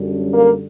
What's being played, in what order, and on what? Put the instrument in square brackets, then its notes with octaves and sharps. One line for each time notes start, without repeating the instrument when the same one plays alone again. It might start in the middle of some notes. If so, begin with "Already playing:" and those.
Already playing: [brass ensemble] F#2 D3 G3
A#3